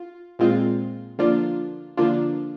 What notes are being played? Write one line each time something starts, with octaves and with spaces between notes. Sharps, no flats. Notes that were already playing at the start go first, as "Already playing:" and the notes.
Already playing: F4
A#2 G#3 C4 F4
D3 F3 A#3 D4 F4
D3 F3 A#3 D4 F4